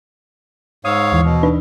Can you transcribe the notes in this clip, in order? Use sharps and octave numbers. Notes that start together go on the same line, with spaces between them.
G#2 C#5 F5 D#6 E6
D#2 E3
B2
D4 D#4 B4